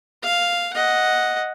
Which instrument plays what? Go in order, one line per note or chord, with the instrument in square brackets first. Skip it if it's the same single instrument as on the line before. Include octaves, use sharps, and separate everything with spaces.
[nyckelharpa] F5
D#5 F#5